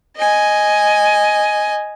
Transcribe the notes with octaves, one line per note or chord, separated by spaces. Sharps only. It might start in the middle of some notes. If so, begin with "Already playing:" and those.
D#5 G#5